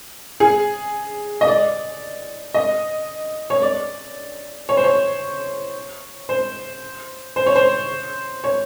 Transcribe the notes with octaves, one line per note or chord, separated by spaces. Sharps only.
G#4
D#5
D5
D#5
C#5
D5
C#5
C5
C#5
C5
C5
C#5
C5
C#5